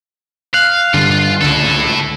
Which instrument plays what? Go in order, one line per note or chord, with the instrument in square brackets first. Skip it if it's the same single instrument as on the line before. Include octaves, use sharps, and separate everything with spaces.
[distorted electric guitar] F5 [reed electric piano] F#6
[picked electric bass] G2 D3 D4 [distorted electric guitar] F4
[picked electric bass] C#2 D3 [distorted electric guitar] E4 A4